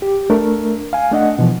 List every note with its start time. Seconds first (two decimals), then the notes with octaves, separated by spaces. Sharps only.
0.02 G4
0.30 A3 D4 A#4
0.93 F5 G#5
1.11 A3 D4 D#5 F#5
1.39 B2 E3 F3